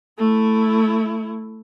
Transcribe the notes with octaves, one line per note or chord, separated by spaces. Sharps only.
A3 E4